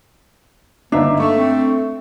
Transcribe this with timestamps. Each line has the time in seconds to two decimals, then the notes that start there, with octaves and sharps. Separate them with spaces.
0.92 G1 A#3 D4 D#4 E5
1.20 A3 C#6
1.37 C4